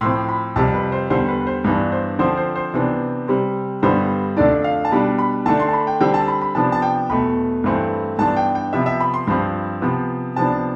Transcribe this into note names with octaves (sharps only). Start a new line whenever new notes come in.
A2 F3 C4 C6
B5
F2 C3 G3 A5
B4
C5
E2 D3 G3 C5
B4
B4
C5
G2 E3 B3 D4
C5
D3 F3 C4 C5
C5
C5
C3 E3 B3 D4
C3 G3 C4
G2 D3 G3 B3 C5
F2 D3 A3 D4 D5
F5
A5
B2 G3 D4 B5
B5
D3 A3 D4 A5
C6
A5
B5
G5
D3 G3 C4 G5
A5
B5
B5
C3 F3 B3 D4 A5
A5
G5
E2 B2 A3 B5
G2 E3 A3 C4
G2 E3 B3 D4 A5
G5
G5
C3 F3 B3 E5
E5
B5
C6
G2 F3 C4 B5
C3 F3 B3
C3 F3 B3 D4 A5